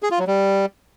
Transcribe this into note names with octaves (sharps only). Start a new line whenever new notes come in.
G#4
F4
F#3
G3